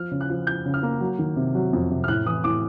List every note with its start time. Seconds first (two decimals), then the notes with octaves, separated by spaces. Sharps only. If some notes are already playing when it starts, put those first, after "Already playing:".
Already playing: F3 F6
0.11 C#3
0.21 F#6
0.30 F3
0.47 F3 G6
0.66 C#3
0.74 F6
0.83 A#3
1.01 F#3
1.19 D#3
1.36 C3
1.55 F#3
1.73 F2
1.90 C3
2.04 F6
2.08 A2 F#6
2.26 E3 D#6
2.44 A2 D6